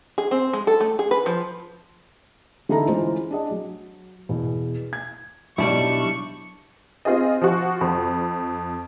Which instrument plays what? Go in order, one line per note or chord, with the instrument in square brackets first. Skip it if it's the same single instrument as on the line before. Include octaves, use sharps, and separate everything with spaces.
[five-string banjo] G#4
C4
G#3
A4
A3
G#4
B4
F3
[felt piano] D3 E3 D#4 E4 A4 A#5
E3 G#3 C#4 F4 C5
D4 G#4 D#5
F#3
E2 B2
G#6
[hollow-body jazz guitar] B1 F#2 [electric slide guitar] G3 D4 E4 [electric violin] C#6
[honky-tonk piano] C4 F4 G#4 D#5
F3 F#4
F2